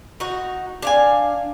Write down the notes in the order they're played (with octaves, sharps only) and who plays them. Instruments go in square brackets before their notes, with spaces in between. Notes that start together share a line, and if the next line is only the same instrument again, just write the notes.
[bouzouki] D#4 F#4
D4 F5 G#5